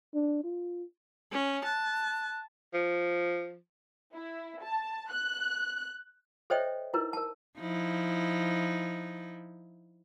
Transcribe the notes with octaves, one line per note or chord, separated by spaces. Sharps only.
D4
F4
C#4
A5 F#6
F3
E4
A5
F#6
A4 C5 C#5 D#5 E5 G5
D#4 E4 A#4 B4
A#4 A5
F3 D#4 E4